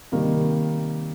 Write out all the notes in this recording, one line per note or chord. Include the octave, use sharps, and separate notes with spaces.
C3 D#3 G3 A#3